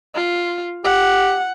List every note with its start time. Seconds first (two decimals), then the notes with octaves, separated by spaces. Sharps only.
0.16 F4
0.85 G4 F#5